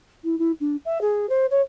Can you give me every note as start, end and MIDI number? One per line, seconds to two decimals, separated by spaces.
0.24 0.38 64
0.39 0.52 64
0.60 0.76 62
0.85 1.01 76
1.01 1.28 68
1.29 1.46 72
1.50 1.61 73